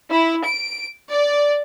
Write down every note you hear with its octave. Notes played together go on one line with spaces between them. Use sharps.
E4
D7
D5